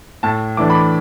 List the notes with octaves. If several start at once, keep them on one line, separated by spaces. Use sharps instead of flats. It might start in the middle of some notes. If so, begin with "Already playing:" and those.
A2 A5
E3 A3 D4 D6
B5
D6